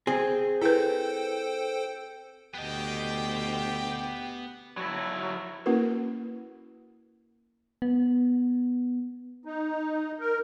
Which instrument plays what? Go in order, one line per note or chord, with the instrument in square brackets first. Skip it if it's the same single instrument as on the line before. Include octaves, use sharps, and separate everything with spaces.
[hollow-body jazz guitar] C4 G#4
[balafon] E4 B4 [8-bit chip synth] A4 C5 G5
[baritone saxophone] D2 [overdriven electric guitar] B3 D#5 [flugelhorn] G4 [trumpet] G5
[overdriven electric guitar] F#3 E4
[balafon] A#3 C#4 E4 F#4 A#4 B4
[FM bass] B3
[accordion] D#4
A#4